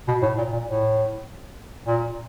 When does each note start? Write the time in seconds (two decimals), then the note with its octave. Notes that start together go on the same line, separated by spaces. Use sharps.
0.08 B2
0.22 A2
0.38 A#2
0.53 A#2
0.68 A2
1.87 A#2